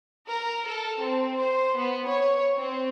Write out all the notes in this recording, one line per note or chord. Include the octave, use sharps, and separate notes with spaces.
A#4
A4
C4
C5
B3
C#5
C4